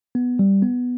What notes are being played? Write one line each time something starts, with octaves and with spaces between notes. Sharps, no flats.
B3
G3
B3